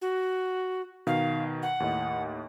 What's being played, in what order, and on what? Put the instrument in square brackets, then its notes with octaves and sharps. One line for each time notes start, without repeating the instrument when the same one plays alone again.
[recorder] F#4
[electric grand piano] B2 D#3 [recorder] F5
[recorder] F#5
[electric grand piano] D#2 A2 D#5